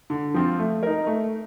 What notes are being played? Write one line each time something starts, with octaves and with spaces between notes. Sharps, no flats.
D3
F3 C4 F4
A3
D#4 A#4
A3